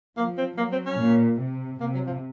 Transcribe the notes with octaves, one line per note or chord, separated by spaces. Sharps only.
F3 A#3
C4
F#3 A#3
C4
C#4
A#2
C3
C3 A#3
F#3
F3